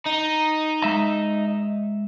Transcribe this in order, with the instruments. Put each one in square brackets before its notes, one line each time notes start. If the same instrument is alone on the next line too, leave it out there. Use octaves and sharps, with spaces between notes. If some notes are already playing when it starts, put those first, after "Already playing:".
[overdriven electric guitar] D#4
[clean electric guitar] G#3 E5 A#5